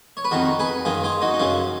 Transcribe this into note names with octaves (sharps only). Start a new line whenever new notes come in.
C#5
B4
F2 D#3 F#4 A#4
G#4 B4
F#2 D#3 F4 G#4
F4 G#4
D#4 F#4
D#4
F#2 C#3 C#4 F4